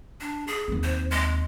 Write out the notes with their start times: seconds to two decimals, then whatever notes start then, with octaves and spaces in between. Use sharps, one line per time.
0.21 D4
0.47 G#4
0.68 D#2 C4
0.83 C5
1.11 G#3